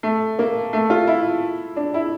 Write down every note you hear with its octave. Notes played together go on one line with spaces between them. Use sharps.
A3
A#3
A3
F4
E4
D4
E4